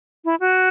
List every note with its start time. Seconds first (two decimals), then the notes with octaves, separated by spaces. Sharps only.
0.25 E4
0.40 F#4